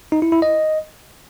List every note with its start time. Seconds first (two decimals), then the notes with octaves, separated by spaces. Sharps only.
0.12 D#4
0.22 E4
0.32 E4
0.42 D#5